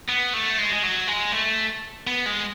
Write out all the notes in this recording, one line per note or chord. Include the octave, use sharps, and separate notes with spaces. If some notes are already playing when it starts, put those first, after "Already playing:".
B3
A3
G#3
G#3
F#3
G#3
A3
B3
G#3